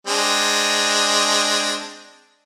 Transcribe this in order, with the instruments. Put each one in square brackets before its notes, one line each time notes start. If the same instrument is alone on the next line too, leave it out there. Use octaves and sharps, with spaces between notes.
[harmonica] G#3 C4 D4